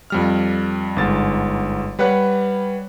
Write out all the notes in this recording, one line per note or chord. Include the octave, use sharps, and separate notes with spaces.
F2 G3 F6
G1 G#2 A6
G3 B4 C#5 F#5 F#6